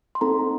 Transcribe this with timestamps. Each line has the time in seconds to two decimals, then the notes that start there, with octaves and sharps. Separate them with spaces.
0.15 C6
0.21 C4 D#4 A4 A#5